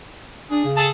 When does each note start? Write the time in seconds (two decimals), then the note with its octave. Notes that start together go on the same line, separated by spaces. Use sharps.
0.51 D4 G#4
0.64 C#3
0.77 G#4 A4 A5